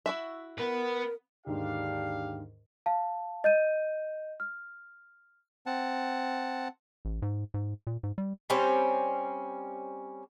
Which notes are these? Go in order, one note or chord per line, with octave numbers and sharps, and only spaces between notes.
E4 F#4 E5
B3 A#4 B4
D#2 G#2 D3 D4 G4 F5
F5 A5
D#5 G6 D#7
F6
C4 F#5 A5
A1
G#2
G#2
A#2
G#2
G3
G3 C4 C#4 C5